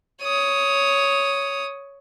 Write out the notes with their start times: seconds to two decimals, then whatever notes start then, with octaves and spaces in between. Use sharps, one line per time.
0.22 C#5 D#6